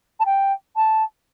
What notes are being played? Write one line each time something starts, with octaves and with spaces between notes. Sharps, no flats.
A5
G5
A5